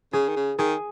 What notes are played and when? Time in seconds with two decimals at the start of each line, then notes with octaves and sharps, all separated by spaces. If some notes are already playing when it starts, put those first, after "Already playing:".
0.13 C#3 G#4
0.29 D#3
0.37 C#3
0.59 D#3 G#4